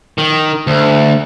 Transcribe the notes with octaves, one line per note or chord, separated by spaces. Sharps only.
D#3
D2